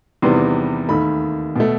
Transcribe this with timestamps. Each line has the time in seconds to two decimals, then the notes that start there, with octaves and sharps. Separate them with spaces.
0.22 E2 C3 D#3 G3 B3 C6
0.89 D#2 D#3 A3 B5
1.56 B2 A3